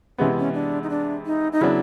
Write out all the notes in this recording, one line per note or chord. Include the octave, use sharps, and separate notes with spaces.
C3 E3 G#3 B3 C#4
C#4
D4
D#4
D4
D#4
D#4
C#3 F#3 B3 D4 E4